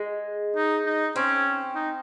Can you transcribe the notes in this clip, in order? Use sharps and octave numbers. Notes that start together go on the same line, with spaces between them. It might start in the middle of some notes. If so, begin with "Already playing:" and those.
Already playing: G#3
D#4
D#4
C4 C#4
D#4